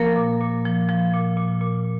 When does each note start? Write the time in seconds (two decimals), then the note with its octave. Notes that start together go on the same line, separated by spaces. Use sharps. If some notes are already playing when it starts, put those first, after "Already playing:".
Already playing: F3 A#3 A#4
0.16 A#2
0.40 A#2
0.65 F3
0.89 F3
1.14 A#2
1.37 A#2
1.61 A#2